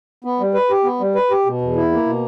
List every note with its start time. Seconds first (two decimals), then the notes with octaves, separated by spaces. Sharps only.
0.25 B3
0.40 G3
0.54 B4
0.70 G4
0.84 B3
1.00 G3
1.15 B4
1.31 G4
1.46 B2
1.61 E2
1.76 E4
1.92 A#3
2.06 B2